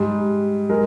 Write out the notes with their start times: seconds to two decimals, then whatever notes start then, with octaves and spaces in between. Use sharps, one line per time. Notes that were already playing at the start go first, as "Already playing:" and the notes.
Already playing: G#2 G3
0.69 G#3 A#4